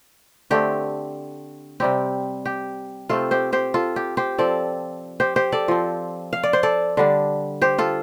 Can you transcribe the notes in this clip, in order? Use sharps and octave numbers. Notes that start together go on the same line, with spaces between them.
D3 A3 C4 G4
C3 G3 C4 G4
G4
C3 A3 C4 F4 A4
G4 C5
G4 C5
F4 A4
G4
G4 C5
F3 C4 A4 D5
G4 C5
G4 C5
A4 D5
F3 C4
F5
D5
C5
A4 D5
D3 G3 D4
G4 C5
F4 A4